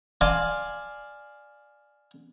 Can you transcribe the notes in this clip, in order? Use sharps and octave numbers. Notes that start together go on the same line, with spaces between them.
D5 F5 G#5 A5 C6